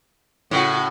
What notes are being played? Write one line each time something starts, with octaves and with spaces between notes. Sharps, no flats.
A2 C#3 F#4